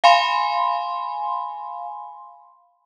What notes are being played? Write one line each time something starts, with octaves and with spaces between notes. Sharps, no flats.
F5 G#5 B5 C6